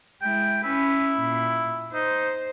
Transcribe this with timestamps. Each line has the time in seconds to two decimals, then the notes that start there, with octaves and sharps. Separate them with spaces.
0.22 G#3 E4 G5
0.64 C#4 E4 B4
1.19 A#2
1.94 D#4 C5